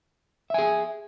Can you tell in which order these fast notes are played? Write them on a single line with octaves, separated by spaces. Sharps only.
E5 G#5 G#4